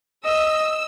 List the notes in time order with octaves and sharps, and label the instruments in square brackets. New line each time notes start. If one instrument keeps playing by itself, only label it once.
[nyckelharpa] D#5 [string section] E6